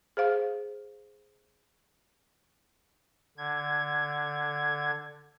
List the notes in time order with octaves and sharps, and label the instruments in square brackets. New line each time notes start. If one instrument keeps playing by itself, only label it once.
[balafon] G#4 C5 F5
[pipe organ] D3 G#6